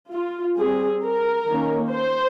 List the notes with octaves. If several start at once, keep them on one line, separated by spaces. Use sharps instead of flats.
F4
G3 C4 G#4
A#4
D#3 A#3 C#4
C5